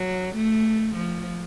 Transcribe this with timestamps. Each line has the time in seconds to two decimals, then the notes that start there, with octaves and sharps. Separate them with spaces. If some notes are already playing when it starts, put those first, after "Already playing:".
Already playing: F#3
0.35 A3
0.95 F3